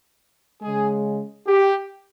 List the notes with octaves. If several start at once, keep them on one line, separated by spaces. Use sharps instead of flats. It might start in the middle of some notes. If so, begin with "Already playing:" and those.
C#3 G#3 G#4
G4